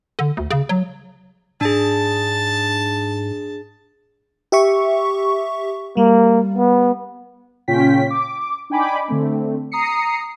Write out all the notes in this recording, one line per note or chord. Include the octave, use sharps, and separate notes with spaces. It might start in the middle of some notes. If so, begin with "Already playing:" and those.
D3
D2
C#3
F#3
G#2 D4 G#4 A5
G4 E5 C#6
G3 A#3
B3
A#2 C#3 C#4 F4 G5 B6
D6
D4 D#4 G5 G#5 B5 D6
D3 A3 C4
A#5 D#6 C7 C#7